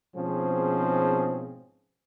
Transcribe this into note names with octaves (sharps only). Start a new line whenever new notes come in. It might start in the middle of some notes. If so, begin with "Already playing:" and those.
G#2 B2 F3 C4 C#4 G#4